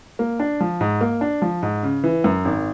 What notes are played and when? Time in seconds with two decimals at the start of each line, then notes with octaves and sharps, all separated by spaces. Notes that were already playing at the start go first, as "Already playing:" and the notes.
0.19 A#3
0.40 D4
0.60 F3
0.81 G#2
1.01 A#3
1.21 D4
1.42 F3
1.63 G#2
1.83 C#3
2.04 E3
2.24 F#2
2.45 G#1